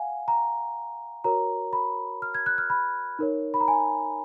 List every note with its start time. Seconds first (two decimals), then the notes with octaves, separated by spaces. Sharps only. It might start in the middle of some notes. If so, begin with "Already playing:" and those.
Already playing: F5 F#5 G#5
0.28 A#5
1.24 F#4 A#4 C#5 A#5
1.73 B5
2.22 F6
2.34 G#6
2.46 F#6
2.58 F6
2.70 B5
3.19 D#4 A#4 C#5
3.54 B5
3.61 A#5
3.68 G#5